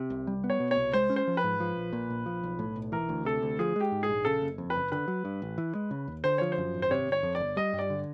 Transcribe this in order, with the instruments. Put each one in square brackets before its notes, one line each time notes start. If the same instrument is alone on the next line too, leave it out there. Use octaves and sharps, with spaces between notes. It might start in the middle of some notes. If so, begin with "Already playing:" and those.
Already playing: [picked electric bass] C3
C2
G3
B3
[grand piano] C#5
[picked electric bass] B2
[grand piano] C#5
[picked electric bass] C2
[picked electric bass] G#3 [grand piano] C5
[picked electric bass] C#4
[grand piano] C5
[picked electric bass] F3
[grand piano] B4
[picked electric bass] G#2
F3
A#1
A#2
A#1
F3
B1
A2
B1
[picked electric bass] E3 [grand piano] A#4
[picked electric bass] D2
[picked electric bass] C3 [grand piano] A4
[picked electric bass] D2
[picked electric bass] F3 [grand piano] G#4
[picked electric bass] G#3 [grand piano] G4
[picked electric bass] G#2
[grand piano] G#4
[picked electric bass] A#1
[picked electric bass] C#3 [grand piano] A4
[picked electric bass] F#1
F2
[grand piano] B4
[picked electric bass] F#1
[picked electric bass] D3 [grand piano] B4
[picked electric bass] F#3
G2
A1
E3
G#3
C#3
D#2
[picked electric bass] D3 [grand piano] C5
[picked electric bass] F3 [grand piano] C#5
[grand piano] C5
[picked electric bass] F#2
G#1
[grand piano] C5
[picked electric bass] C3 [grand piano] C#5
[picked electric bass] G1
[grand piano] C#5
[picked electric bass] F2
[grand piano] D5
[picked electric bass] G1
[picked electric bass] G3 [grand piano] D#5
[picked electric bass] G2
[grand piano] D5
[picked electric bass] D3